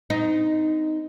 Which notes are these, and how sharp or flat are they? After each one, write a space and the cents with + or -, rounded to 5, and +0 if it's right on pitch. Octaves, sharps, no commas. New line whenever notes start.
C4 -40 D#4 +0